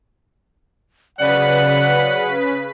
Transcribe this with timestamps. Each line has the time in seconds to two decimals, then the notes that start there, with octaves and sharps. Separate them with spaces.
1.19 C#3 F#3 B4 D5 F#5 B6